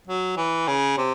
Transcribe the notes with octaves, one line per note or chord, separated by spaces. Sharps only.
F#3
E3
C#3
C3